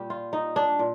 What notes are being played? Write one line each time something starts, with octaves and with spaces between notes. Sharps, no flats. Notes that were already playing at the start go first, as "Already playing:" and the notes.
Already playing: A#2 G3 G4
F4
D#4
D4
A#2